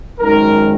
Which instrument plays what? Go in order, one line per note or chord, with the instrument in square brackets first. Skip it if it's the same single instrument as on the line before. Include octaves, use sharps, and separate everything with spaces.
[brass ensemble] G#1 F#2 D#3 G#3 A#4